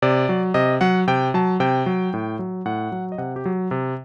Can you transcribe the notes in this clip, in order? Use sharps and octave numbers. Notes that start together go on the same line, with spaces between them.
C3 D5
F#3
C3 D#5
F#3 F#5
C3 G5
F#3 A5
C3 G5
F#3
A2
F#3
A2 F#5
F#3
D#5
C3 F#5
G4
F#3
C3